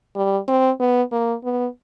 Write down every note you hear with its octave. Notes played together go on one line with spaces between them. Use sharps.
G3
C4
B3
A#3
B3